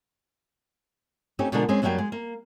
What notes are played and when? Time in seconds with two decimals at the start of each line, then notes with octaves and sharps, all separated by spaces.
1.39 A3 C4 C#4 D#4 G4
1.52 B2 D3 F3 G#3 D4 A#4
1.69 G#3 C4 C#4
1.82 F#2 D3 F#3 G3 A#3 G5
1.98 G#3
2.12 A#3